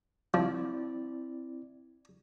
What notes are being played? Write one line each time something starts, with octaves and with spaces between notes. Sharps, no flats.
F3 C4 E4 D5